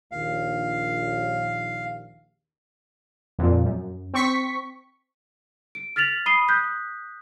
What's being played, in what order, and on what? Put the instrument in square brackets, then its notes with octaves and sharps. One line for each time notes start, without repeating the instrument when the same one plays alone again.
[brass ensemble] A#1 D#2 [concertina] F5
[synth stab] F2 A#2
F#2
C4 C#6 B6
[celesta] D7
F6 A6 B6 F7 F#7
B5 D#6 C7 D#7 G7
D#6 F#6 G6 B6